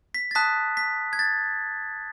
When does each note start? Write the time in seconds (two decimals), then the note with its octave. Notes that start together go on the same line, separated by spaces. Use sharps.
0.14 B6
0.31 A6
0.35 A5 D#6 F#6 B6
0.77 B6
1.13 G#6
1.19 A6